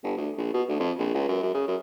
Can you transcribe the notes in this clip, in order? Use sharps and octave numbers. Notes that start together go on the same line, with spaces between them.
G1
D2
A#1
B2
D2
F2
A#1
C#2
F#2
F#2
C#3
F#2